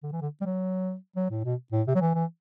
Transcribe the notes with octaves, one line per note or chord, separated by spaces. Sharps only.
D3
E3
D3
G3
F#3
F#3
A2
B2
A2
C3
F#3
E3
E3